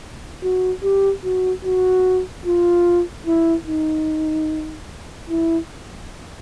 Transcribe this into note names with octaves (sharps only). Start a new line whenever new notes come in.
F#4
G4
F#4
F#4
F4
E4
D#4
E4